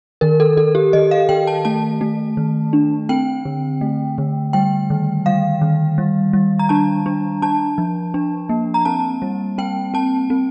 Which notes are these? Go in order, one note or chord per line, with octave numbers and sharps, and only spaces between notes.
D#3 A#4
A4
D#3 A4
G4
D#3 D#5
F5
D#3 G5
A5
A3 A5
A3
D#3
D4
C4 G5
D3
A3
D3
G3 G5
D#3
G3 F5
D#3
G3
G3
A#5
D4 A5
D4
D4 A5
F3
D4
A#3
A#5
C4 A5
G3
C4 G5
C4 A5
C4